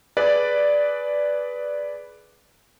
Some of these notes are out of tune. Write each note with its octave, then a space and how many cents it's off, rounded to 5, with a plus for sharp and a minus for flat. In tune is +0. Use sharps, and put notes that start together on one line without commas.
G#4 +25 B4 +0 D5 +0